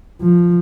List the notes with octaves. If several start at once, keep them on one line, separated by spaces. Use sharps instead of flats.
F3